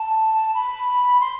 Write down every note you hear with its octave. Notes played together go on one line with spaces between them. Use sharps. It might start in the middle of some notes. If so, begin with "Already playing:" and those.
Already playing: A5
B5
C6